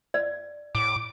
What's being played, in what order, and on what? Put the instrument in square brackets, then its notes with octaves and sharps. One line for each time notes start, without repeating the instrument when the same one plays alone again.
[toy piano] D5
[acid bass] A2 [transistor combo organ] D6